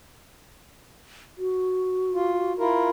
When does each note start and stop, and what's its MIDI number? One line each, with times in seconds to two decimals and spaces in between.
1.38 2.63 66
2.14 2.53 65
2.59 2.90 64
2.59 2.90 65
2.59 2.90 70